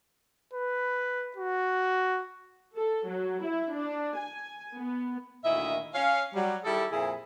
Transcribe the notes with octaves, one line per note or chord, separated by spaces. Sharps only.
B4
F#4
A4
F#3
E4
D4
G#5
B3
D2 A#2 D#3 E4 D#5 E5
C#4 F5
F#3 G3
D#3 G3 E4 G#4 A4
F2 A#2 E4 G#4